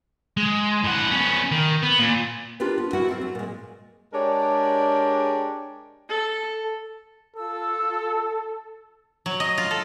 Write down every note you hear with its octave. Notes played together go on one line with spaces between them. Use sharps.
G#3
A2 F#5
B3 C#4
D#3
B3
A#2
D4 F4 G4 A#4 B4
B3
E4 F#4 A#4 E5 F#5
A3 C4 A#4
F#3
A#2 G#3
G#3 D4 G4 A#4 C#5 D5
A4
F4 A4 E6
F#3
D#5
F4
A4